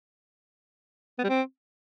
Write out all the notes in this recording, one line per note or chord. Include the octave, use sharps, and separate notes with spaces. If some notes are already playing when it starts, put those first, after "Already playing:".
B3
G3
C4